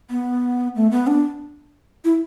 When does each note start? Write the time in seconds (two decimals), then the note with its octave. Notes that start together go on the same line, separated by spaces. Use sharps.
0.10 B3
0.76 A3
0.91 B3
1.07 D4
2.05 E4